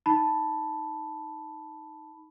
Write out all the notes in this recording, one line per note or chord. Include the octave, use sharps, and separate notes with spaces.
D#4 A5 B5